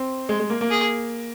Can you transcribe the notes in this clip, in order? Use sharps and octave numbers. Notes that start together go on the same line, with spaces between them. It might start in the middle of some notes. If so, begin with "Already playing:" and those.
Already playing: C4
G#3
G#3
A#3
A#3
G#4